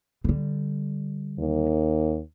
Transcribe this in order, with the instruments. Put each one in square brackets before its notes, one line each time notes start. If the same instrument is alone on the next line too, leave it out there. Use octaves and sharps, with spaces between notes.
[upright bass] D3 G3
[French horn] D#2